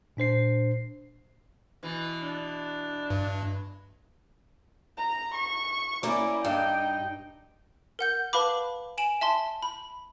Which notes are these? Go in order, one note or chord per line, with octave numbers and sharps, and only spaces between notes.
A#2 D4 C5 C7
B2 E3
D4
G2
A#5
C#6
A#3 C#4 E4 D5
G2 D#4 G5
A#4 F#5 G6
B4 F5 A5 B5 D6
G#5 D7 E7 F#7
E5 A5 C6
B5